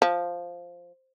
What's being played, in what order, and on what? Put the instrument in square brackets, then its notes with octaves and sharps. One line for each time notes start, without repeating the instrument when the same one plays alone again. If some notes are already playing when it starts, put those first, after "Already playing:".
[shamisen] F3